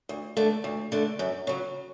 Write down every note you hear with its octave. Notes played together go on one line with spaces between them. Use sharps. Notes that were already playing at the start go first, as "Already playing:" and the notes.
D2
D3 A3
D2
D3 A3
F#2
C#3 F#3